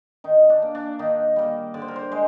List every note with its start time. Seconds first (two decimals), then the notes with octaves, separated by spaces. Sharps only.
0.24 D#3 D#4
0.50 D4
0.62 A#3
0.75 D4
0.99 D#3 D#4
1.36 G3 A#3
1.74 D3 D5
1.82 C5
1.88 A#4
1.96 C5
2.12 G#3 C5